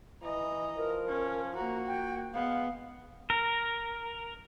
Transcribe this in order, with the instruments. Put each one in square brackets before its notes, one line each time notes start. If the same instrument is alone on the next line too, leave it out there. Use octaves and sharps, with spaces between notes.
[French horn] E3 [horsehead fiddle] D#5 A#5
[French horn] F3 [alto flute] A#4
[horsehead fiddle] C#4
[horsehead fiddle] A#3 F#4 [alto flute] A#5
[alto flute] G5
[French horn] G#3 [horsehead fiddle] B3 [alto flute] F5
[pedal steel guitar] A#4